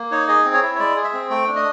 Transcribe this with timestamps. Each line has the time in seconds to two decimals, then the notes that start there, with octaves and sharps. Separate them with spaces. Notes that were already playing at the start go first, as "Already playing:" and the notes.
Already playing: A#3
0.11 D#4 C#5
0.28 G#4 D#5
0.45 C4
0.54 C#5
0.63 E4
0.75 C#5
0.79 G#3 D5
0.96 G#4
1.04 E5
1.13 C4
1.30 A3 G5
1.47 D4
1.56 D#5